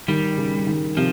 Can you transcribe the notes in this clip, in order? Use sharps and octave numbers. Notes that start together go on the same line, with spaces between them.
D#3 G3
C#3
D#3
C3 F3